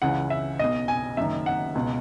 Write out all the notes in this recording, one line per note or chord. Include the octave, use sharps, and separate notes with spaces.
C#2 C#3 E3 F#5
E5
B1 B2 D#5
G#5
F#1 F#2 D#3 E5
F#5
C#2 B2